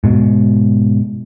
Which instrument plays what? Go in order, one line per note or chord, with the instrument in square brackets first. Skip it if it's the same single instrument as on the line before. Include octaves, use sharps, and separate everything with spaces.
[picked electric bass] G#2 B2